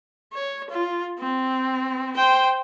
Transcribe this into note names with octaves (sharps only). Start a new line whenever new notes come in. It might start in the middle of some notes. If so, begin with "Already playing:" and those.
C#5
F4
C4
C5 G5